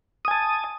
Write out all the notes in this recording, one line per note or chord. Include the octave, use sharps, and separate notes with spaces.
G#5 A5 D#6